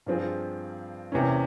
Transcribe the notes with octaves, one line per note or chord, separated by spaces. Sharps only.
G2 F3 C4 F4 G#4
E2 C3 E3 A#3 C#4